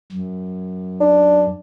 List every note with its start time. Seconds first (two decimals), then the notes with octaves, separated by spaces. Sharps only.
0.12 F#2
1.00 D4